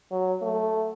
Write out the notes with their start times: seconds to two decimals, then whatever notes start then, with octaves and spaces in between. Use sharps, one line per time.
0.11 F#3
0.42 A3